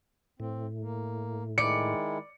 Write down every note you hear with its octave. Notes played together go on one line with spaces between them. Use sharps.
A2 C4
A#3
D#3 G#3 E4 D5 C#7